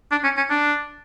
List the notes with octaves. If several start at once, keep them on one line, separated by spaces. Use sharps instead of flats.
D4
C#4
C#4
D4